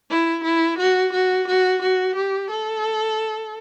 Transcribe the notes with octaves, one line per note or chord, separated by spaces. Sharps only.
E4
E4
F#4
F#4
F#4
F#4
G4
A4